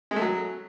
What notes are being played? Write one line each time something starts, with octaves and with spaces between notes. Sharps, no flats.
G#3
A3
F#3